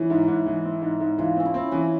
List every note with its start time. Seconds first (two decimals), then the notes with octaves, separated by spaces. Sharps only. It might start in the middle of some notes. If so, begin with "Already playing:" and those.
Already playing: E3 C#4 E4
0.10 G#2
0.28 G#2
0.46 E3
0.64 C4
0.82 G#2
1.00 G#2
1.18 E3 F4
1.36 C4 C#4
1.45 E4
1.54 C4
1.72 E3 C#4